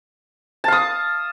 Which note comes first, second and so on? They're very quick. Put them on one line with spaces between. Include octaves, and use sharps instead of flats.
A5 F5 D#6